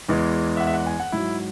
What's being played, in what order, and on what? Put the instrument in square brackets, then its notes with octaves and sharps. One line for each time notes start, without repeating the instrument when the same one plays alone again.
[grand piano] E2 E3 G#3
E5
F#5
E5
F#5
G#5
F#5
G#2 F#3 E4